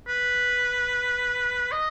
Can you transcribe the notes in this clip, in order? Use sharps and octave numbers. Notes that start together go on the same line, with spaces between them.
B4
D#5